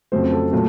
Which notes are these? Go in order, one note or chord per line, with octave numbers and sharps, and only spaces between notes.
F2 C#3 F#3 A3 C5
A4
A#2 F#3 A3